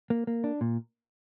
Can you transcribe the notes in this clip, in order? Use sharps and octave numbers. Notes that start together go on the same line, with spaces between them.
A#3
A#3
D4
A#2